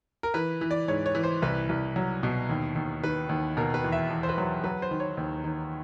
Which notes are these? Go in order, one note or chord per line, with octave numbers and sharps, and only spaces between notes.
A#4
E3 B4
E3
D5
G#2 C#5
C#5
E3
C5
C2 B4
C2
F#3
B2
D#2
D#2
D#3 B4
D#2
B2 A#4
B4
E2
E5
E2
C5
B4
F#3
F#3 B4
C5
D#3
C#5
D#2
D#3